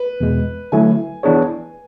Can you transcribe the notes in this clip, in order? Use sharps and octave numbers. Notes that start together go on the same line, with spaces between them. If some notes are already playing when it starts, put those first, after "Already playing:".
Already playing: B4
E2 B2 G#3
D3 F#3 A3 E4 G#5
E3 B3 D4 G#4 C#5